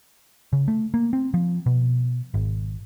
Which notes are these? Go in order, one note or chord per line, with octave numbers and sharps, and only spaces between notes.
C#3
A3
A#3
C4
F3
B2
G#1